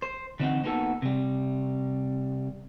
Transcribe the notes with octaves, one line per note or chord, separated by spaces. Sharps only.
C5
D3 E3 C4 D4 D#4 F#4
A#3 B3 D#4 F#4 A4
C3 G3